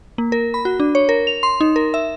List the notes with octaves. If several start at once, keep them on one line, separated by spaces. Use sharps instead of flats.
A#3
A#4
B5
F#4
D4
C#5
A#4
F7
C6
D#4
A#4
E5